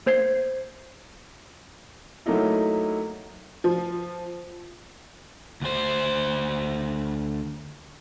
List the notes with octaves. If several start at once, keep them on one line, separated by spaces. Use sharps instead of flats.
A#3 C5 G#6 C7
F#3 A3 A#3 D#4 E4
F3
D2 C5